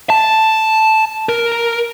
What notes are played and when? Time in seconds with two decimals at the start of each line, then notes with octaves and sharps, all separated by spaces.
0.10 A5
1.29 A#4